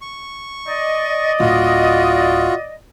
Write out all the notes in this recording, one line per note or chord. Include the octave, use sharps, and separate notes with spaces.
C#6
D5 D#5
D1 F4 F#4